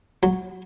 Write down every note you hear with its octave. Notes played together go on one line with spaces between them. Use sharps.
F#3